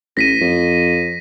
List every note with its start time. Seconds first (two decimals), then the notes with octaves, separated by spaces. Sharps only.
0.17 A1 A#6 B6 D#7
0.41 F2